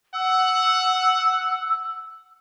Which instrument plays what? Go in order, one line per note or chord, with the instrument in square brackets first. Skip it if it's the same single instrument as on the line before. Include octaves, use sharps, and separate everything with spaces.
[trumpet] F#5 [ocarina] E6